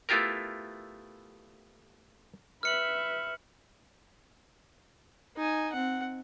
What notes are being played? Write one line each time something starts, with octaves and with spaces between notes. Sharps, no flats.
A3 B3 E4 F4 G4 A#4
B4 E5 F6 C#7 F#7
D#4 G#5
C4 F#5